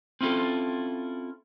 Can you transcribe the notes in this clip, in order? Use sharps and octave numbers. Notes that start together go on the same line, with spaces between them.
C4 C#4 E4 F4 A4